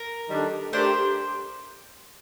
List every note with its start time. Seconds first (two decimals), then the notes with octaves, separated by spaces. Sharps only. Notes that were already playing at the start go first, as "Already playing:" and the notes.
Already playing: A#4
0.30 D#3 G3 D4 A4
0.73 A3 D4 G4 A#4 C5